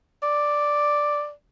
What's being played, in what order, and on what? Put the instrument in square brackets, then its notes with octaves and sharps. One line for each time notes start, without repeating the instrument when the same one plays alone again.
[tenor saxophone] D5